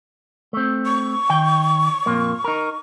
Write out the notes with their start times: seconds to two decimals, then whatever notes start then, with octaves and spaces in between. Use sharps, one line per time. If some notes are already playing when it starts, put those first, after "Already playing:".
0.53 A3 C4
0.86 C#6
1.30 D#3 G5
2.06 F2 A#2 A#3
2.44 D#4 A#4